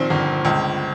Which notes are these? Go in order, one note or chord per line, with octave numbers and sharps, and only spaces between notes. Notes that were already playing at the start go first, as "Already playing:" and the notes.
Already playing: A#1 A#2 D#3 C4
G1
C#2